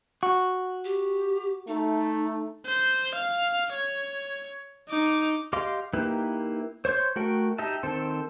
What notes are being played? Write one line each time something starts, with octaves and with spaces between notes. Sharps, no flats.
F#4
G4
A3 D#4
C5
F5
C#5
D#4 D6
G4 D#5 F5 C6 D6
A#3 D#4 E4 G4 B4
C5 C#5 C6 G6
A3 F#4 A#4 G5
D#4 G4 D#5 E5 A5
D#3 C4 A4 C5